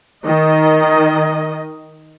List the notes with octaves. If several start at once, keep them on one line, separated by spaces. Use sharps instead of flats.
D#3 D#5